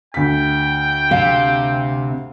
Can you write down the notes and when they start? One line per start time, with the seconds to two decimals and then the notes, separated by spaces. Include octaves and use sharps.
0.14 D2 G5 B6
1.11 C3 F5